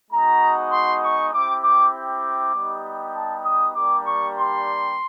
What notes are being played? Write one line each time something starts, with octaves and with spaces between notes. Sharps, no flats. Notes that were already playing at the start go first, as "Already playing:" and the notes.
G#3 B3 D#4 F#4 A#5
C6
C#6
C4 E4 G4 D6
D6
D6
G3 B3 D#4 G4
A5
D#6
G3 A#3 D4 G4 D6
C#6
C6